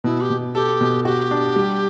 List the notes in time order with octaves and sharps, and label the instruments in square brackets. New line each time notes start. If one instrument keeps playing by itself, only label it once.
[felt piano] B2 [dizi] E4
[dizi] G4
[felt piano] B2
[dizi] G4 [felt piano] A4
[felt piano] B2
[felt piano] F#4 [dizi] G4
[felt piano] D4
G3